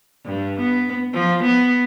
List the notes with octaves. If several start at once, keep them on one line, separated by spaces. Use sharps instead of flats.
G2
B3
F3
B3